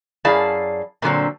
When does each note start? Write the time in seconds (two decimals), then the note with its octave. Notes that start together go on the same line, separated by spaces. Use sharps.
0.25 F#2 E4 G#4 D5 F5 A5
1.02 A#2 D3 F#3 C4